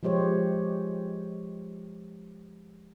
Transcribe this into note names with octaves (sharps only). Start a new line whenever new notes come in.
F3 G#3 G4 C5 C#5